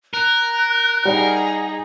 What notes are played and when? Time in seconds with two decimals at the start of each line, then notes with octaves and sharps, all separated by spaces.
0.14 A#4 F#6
1.05 G3 D#4 G#4 F#5